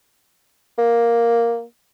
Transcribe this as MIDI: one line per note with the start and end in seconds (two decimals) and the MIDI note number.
0.78 1.63 58